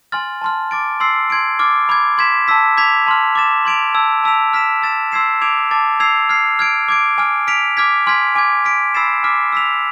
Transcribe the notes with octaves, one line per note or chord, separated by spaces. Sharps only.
G#5 C6 F6 A6
A5 C6 F6
D6 A6 D7
C6 E6 A6 C7
C6 G#6 D7
D6 F6 A6
B5 D6 G#6
C6 G#6 B6 E7
A5 E6 B6
D6 G#6 B6 F7
A5 C6 F6
D6 A6 E7
C6 G#6 D7 F7
A5 E6 G#6
A5 E6 B6 D7 F7
F6 B6 E7
E6 A6 E7
C6 E6 G#6 C7 E7
D6 G#6 D7 F7
A5 D6 A6
E6 G#6 C7 F7
F6 G#6 C7
F6 G#6 D7
D6 G#6 D7
G#5 D6 F6
F6 B6 D7 F7
D6 F6 G#6 B6
G#5 C6 F6 G#6 B6
G#5 D6 F6 G#6
F6 B6 D7
B5 E6 A6 C7 E7
G#5 D6 F6 B6
E6 B6 F7